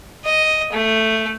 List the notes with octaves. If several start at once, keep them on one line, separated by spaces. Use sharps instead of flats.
D#5
A3